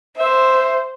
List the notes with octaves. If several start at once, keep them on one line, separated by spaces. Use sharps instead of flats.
C5 E5